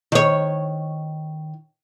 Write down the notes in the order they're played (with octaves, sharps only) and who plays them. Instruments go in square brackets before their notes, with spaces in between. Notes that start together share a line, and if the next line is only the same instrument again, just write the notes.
[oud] D#3 C#5